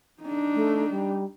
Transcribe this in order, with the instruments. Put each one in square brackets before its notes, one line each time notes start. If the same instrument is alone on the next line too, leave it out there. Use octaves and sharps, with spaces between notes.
[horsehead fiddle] D4 D#4
[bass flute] A3
G3